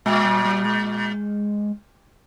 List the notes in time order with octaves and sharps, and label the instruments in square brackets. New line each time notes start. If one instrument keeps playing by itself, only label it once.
[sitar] A#2 [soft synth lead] G#3
[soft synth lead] G3
G3
G#3